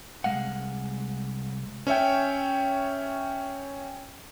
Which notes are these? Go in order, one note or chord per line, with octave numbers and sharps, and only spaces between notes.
C2 A#2 G#3 F5 F#5
C#4 C#5 E5 G5